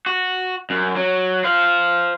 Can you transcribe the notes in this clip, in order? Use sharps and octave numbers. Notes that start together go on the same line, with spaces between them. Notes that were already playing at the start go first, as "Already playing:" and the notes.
F#4
F#2
F#3
C5 F5